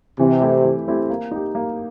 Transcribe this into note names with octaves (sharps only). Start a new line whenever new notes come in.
C3 E3
A3 C4 E4 G4
E3
A3 C4 E4 G4
A#3
D#4 G4
A#3